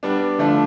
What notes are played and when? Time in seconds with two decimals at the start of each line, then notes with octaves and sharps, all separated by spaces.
0.03 G3 B3 D4
0.38 D3 F3 A3 D4